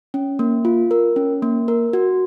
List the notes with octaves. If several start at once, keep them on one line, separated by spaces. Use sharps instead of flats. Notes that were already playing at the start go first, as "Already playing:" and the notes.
C#4
A#3
F4
A#4
C#4
A#3
A#4
F#4